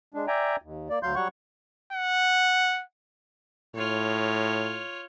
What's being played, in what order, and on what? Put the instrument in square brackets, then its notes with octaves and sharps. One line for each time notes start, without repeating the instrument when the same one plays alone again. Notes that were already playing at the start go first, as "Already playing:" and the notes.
[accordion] G#3 D4
D5 E5 G5 G#5 A#5
D#2
A#3 D5
D2 F#3 F5 C6 G6
F#3 G3 C#5 F#5 C#6
[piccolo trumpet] F#5
[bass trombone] A2 [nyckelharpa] F4 C#5